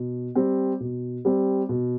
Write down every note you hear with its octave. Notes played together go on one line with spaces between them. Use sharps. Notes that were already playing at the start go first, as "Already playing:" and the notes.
Already playing: B2
G3 C4
B2
G3 C4
B2